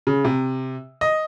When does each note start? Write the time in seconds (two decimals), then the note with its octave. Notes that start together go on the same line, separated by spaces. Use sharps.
0.07 C#3
0.25 C3
1.01 D#5